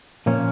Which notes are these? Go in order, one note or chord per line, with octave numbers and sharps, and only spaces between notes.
A#2 F3 A#3 C#4